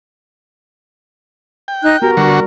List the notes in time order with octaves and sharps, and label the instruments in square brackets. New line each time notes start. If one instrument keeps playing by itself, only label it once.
[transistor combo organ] G5
[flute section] D#4 F#6
[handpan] B3 F#4 G4 [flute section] A#4
[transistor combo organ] D3 F#4 C#6 [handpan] G3